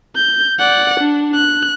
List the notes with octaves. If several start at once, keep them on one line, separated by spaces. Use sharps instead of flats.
G6
D5 F#5
D4
F#6